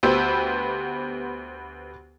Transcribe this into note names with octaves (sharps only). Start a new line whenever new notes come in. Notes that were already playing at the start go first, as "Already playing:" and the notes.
D2 B3 G4 C5 E6